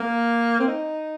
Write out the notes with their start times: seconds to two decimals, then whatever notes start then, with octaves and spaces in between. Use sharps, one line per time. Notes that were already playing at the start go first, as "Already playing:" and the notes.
Already playing: A#3
0.60 C4
0.67 D#4